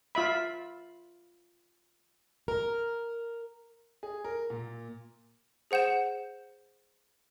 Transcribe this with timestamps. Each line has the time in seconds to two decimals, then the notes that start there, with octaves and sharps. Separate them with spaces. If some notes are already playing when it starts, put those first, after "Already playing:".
0.15 F4 E5 B5
2.48 A#4
4.03 G#4
4.25 A#4
4.50 A#2
5.71 G#4 C5 F#5 G6 E7